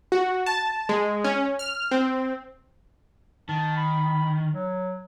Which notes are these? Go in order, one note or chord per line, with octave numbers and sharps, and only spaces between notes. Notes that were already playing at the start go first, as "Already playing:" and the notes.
F#4
A5
G#3
C#4
F6
C4
D#3 A5
B5
F#3